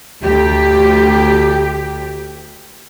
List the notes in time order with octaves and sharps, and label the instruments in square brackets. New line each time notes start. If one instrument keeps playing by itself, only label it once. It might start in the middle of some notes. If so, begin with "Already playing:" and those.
[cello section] D2 G4